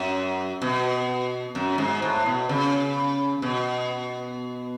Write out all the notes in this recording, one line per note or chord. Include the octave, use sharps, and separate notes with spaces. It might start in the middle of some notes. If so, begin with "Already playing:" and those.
Already playing: F#2
B2
F#2
G#2
A2
B2
C#3
B2